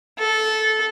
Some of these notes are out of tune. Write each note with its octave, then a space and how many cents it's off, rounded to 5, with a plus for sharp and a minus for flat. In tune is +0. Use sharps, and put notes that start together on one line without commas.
A4 -15